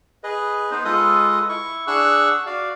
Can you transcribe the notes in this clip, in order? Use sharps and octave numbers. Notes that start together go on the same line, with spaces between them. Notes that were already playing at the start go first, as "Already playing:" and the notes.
G#4 B4 D#5
B3 D#4 B4 C5
G#3 F4 A4 B4 D#5 D#6
E4 C#6
D4 G#4 F#5 C#6 E6 F#6
F#4 D5 F5